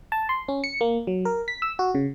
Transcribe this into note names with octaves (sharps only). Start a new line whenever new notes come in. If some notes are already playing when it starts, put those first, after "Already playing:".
A5
C6
C#4
C#7
A#3
F#3
A#4
B6
E6
F#4
C#3